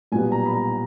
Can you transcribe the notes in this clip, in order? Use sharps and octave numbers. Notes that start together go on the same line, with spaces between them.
B1 A#2 G3 B3 G#5
A#5
B5
A#5